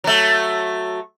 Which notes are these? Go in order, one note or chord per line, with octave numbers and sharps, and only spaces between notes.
F#3 A3